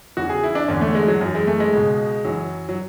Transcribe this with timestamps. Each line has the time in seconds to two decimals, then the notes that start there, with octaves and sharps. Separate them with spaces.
0.17 E2 C#3 E3 F#4
0.29 G#4
0.43 E4
0.55 D4
0.68 E2 D3 C#4
0.81 A3
0.95 G#3
1.08 F#3
1.21 F#2 E3
1.35 G#3
1.47 A3
1.60 G#3
1.73 C#2 B2
2.25 F#2 E3 F#3
2.69 F#3